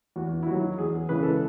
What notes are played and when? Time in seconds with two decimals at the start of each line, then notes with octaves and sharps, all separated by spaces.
0.16 E2 F#4
0.43 E4
0.46 D#3 F#3 F#4
0.78 E2 G#4
1.09 C#3 E3 G#3 B4
1.23 A4